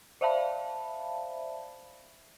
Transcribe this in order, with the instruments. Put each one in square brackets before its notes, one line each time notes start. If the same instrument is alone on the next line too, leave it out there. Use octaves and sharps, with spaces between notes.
[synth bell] C5 D5 E5 F5 A5 B5